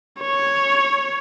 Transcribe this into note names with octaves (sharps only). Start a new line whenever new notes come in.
C#5